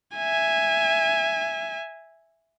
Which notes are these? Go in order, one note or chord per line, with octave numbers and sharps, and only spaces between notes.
E5 G#5